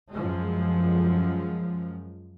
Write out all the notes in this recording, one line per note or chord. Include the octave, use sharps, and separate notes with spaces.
F#2 F3 G#3